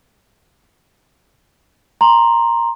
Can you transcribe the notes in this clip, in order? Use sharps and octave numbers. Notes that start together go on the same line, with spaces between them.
A#5 C6